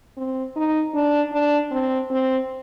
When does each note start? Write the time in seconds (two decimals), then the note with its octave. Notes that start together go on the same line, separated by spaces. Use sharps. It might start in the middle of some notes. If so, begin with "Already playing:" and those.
0.17 C4
0.56 D#4
0.95 D4
1.33 D4
1.71 C4
2.11 C4